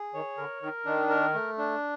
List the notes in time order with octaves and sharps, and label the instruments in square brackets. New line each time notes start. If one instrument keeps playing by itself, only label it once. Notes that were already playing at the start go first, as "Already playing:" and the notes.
Already playing: [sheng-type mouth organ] G#4
[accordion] D#3 [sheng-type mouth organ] C#5
[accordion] D3 [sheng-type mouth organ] A#4
[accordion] D#3 [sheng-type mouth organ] A#4
[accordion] D#3 [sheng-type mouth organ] D4
[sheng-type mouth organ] A#4
A3
D4